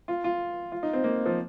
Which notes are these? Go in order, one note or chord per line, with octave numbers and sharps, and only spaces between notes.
F4
F4
F4
D#4
C4
A#3
F3